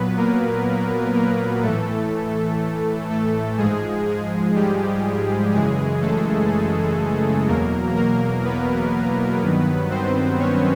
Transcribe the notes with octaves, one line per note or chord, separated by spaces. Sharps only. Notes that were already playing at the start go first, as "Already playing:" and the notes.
Already playing: A#2 F#3 B3 B4
A#3 A#4
A#3 A#4
A2 E3 A3 A4
A3 A4
G#2 F3 G#3 G#4
G#3 G#4
G3 G4
F#2 C#3 E3 G#3 G#4
A3 A4
E2 B2 F#3 A#3 A#4
A#3 A#4
B3 B4
G2 D#3 F#3
C4 C5
C#4 C#5